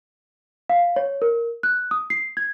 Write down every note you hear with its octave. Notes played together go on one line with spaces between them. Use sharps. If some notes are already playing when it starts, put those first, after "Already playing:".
F5
C#5
A#4
F#6
D#6
C7
G#6